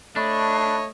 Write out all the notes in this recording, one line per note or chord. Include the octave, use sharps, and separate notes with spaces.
A3 D4 C#5 D#5 B5